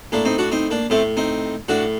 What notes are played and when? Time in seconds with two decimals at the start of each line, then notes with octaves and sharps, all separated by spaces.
0.12 A2 A#3 D4
0.25 C4 D#4
0.38 D4 F#4
0.52 C4 D#4
0.70 A#3 D4
0.90 A2 A3 C4
1.17 C4 D#4
1.68 A2 D4 F#4